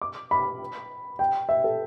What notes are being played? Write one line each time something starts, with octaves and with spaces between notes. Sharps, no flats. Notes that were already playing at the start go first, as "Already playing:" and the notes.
D6
B5
G5
E5
A4